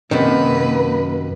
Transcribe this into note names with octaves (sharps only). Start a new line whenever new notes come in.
F#2 C3 D#3 A#3 B4